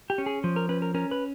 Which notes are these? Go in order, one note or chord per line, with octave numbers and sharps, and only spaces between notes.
G4
C#4
G#4
F3
A#4
C#4 B4
A#4
C#4 A#4
B4